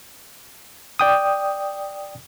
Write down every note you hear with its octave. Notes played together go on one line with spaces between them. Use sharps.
D5 G5 D#6